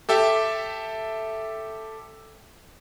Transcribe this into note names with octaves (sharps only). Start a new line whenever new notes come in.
G4 A4 E5 G5